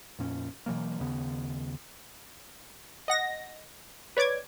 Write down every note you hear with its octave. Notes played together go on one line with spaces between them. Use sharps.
F2 A#2 C#4
B2 E3 F#3 A#3
D#2 C#3 B3
D#5 F#5 A#6
B4 C#5 D5 D6 G#6